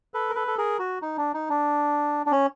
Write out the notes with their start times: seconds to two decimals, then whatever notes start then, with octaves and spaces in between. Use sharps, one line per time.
0.14 A4 B4
0.30 A#4
0.35 A4 B4
0.48 A4
0.58 G#4 A#4
0.79 F#4
1.02 D#4
1.17 D4
1.34 D#4
1.50 D4
2.26 D4
2.32 C#4